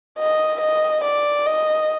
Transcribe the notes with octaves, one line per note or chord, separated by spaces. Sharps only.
D#5
D#5
D5
D#5